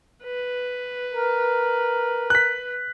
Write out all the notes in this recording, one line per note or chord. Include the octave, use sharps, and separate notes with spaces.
B4
A#4
F#6 B6